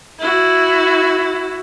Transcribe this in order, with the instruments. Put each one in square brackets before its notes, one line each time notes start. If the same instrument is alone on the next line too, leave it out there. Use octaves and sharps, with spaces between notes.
[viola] E4 F#4